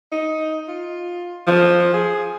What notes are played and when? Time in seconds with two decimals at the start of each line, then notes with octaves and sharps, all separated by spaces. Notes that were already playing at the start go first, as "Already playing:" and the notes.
0.12 D#4
0.68 F4
1.47 F3
1.93 G#4